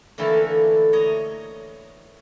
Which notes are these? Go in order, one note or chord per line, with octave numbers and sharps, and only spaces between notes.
D3 E3 A3 A#3 E4
C#5 D#5 A#5